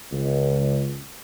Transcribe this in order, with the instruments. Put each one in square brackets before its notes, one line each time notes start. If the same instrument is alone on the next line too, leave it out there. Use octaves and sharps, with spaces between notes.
[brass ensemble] C#2